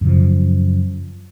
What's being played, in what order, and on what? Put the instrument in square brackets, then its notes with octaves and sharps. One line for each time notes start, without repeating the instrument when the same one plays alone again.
[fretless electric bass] F#2 C#3 F3